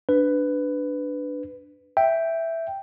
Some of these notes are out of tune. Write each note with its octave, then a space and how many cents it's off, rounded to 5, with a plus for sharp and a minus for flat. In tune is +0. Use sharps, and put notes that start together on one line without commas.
D4 +0 B4 +15
E5 +0 G5 +0